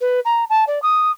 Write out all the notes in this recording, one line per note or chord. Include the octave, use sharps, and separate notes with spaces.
B4
A#5
A5
D5
D#6